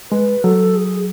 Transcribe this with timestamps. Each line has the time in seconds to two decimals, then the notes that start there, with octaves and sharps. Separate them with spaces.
0.11 G#3 B4
0.44 F#3 A4
0.76 G#4